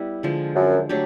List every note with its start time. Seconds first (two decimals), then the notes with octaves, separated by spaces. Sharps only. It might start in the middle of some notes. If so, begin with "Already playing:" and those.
Already playing: G3 B3 E4
0.23 D3 F3 G#3
0.56 F#2
0.89 F#3 A3 D4 G4